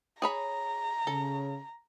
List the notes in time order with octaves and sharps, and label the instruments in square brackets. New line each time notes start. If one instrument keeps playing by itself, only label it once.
[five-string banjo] G#4 C#5 B5 [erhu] A#5
[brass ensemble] C#3 [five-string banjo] A4